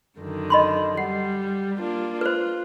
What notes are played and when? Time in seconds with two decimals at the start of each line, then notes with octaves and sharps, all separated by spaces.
0.19 F#2 D3 D#3
0.50 D#5 B5 C6
0.97 G3 F#5
1.78 A#3 D4 F4
2.21 F4 B4 C5